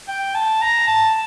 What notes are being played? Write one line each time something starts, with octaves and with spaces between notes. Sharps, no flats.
G5
A5
A#5
A5